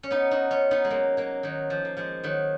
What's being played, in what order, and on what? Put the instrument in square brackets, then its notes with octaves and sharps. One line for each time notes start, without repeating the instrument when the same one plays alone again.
[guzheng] C#4
B3 D#4
D#4 F#4
C#4 F4
B3 D#4
G#3
F#3 A#3
F#3 A#3
D#3 F#3
F3
A#3
F3 G#3
D#3 F#3